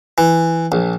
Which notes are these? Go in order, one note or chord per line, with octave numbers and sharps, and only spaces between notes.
E3
A#1